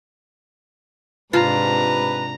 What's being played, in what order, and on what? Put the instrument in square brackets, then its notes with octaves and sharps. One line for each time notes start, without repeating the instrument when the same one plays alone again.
[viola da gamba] G#2 C3 D4 [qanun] F4 [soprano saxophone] B4 [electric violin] A#5